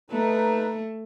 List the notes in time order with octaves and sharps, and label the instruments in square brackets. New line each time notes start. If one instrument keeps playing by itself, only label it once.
[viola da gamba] A3 [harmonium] D#4 B4